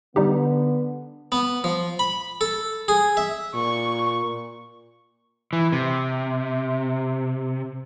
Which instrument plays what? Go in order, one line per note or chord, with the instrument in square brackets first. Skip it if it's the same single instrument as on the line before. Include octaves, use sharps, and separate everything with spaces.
[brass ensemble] D3 B3 [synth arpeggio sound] G3 D#4 G4
[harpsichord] B3
F3
B5
A4
G#4
E5
[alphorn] A#2 [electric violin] C#6
[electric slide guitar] E3
C3